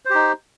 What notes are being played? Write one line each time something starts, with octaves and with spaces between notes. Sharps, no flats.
D#4 G4 C5